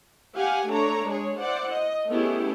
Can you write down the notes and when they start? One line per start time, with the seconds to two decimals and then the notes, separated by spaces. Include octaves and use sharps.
0.36 G4 F5 F#5 G#5
0.70 A3 D4 C#5 A#5
1.07 G#3 G#4 C#5
1.40 E4 C5 D5 F#5
1.73 D#5
2.10 A3 B3 C#4 E4 G4 G#4